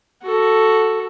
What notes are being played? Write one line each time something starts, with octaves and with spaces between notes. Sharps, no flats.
F#4 A4